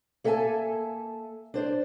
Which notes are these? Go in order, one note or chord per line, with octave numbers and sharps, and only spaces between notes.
A#3 A4 E5 F5 G#5 A5
D4 C5 D5